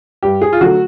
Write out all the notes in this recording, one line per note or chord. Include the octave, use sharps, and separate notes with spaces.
G2 G4
G#4
F4
D3 F#3 A3 F#4